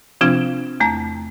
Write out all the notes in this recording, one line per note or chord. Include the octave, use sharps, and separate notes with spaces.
C3 F3 C4 D4 F4
E2 A3 A#5